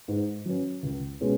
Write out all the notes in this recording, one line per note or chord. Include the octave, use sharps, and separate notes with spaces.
G#2
F#3 C#4
C#2
B2 G#3 C#4 G#4